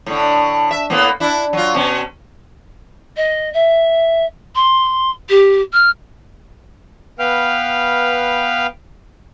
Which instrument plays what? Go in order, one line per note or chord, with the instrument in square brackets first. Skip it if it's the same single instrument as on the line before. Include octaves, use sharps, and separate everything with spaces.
[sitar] A2 D3
E5
A2 A#3 B3
D4 E4
F#3 F4
B2 C#4
[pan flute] D#5
E5
C6
G4
F6
[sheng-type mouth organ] B3 B4 F5 G5 F6